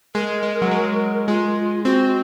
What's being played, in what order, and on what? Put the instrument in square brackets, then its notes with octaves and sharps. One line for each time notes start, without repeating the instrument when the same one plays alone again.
[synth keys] G#3 [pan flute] A#4
[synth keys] G#3
F#3
G#3
[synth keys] G#3 [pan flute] F4
[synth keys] C4 [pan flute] F#4